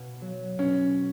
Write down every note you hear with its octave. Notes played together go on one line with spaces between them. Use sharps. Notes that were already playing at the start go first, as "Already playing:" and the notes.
Already playing: B2
F#3
B2 C#4